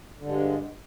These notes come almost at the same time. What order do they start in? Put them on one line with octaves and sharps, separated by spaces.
D3 G2 G#3